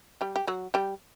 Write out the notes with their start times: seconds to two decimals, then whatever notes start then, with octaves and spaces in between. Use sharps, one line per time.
0.21 G3 G4
0.36 G4
0.47 F#3 F#4
0.74 G3 G4